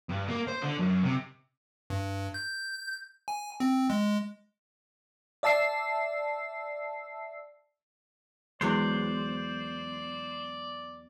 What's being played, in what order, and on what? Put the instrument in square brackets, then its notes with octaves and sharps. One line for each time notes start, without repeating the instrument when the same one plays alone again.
[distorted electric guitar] G2
A#3
C5
D3
F#2
C3
[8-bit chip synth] G2
G6
G#5
C4
G#3
[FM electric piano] D5 E5 A5 E6 C7
[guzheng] E2 F#3 G#5 [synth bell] G#3 [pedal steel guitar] C5 [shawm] D5